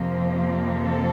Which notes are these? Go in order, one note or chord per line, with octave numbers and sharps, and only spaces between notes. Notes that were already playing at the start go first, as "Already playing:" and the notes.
Already playing: F2 C3 F3 A#3
A4